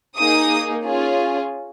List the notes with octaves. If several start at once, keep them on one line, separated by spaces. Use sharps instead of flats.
A#3 D#4 G#4 D#6
C#4 F4 G#4